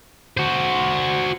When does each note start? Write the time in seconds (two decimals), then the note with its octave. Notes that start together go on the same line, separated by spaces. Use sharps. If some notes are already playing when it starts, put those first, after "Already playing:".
0.37 F#4 C5